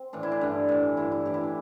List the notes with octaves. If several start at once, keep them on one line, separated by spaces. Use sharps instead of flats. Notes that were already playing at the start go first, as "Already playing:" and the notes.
Already playing: C4
A2 E3 D4
E4
D4
G2 D3
A2 E3
G2 D3 E4
E4
A2 E3 G4
E4
D4